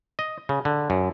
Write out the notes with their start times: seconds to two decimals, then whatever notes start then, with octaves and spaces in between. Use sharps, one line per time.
0.19 D#5
0.49 C#3
0.65 D3
0.90 F#2